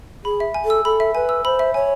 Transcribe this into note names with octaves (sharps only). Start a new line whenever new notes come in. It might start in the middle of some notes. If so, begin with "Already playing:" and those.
G#4 B5
E5
G#5
A4
E6
A4 B5
E5
B4 G#5
E6
C5 B5
E5
C#5 G#5